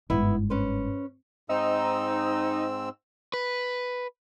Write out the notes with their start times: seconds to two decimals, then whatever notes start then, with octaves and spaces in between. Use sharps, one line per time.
0.10 G1 G#2 B3 E4
0.50 C#4 B4 C5
1.49 G#2 C4 D#4 E6
3.34 B4